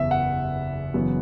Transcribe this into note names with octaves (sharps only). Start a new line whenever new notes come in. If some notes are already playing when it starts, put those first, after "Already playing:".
Already playing: F#1 E2 B3 E5
F#5
F#1 F#2 E3 B3